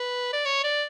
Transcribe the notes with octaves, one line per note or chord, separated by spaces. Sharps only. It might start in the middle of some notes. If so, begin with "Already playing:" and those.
Already playing: B4
D5
C#5
D5